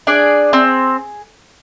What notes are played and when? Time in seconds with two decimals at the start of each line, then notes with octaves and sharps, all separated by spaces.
0.07 D4 G#4 D5
0.53 C4